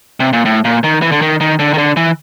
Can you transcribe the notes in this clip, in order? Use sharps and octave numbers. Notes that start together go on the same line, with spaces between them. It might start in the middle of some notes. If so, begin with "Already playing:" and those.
C3
A#2
A2
A#2
D#3
E3
D3
D#3
D#3
D3
D#3
D3
E3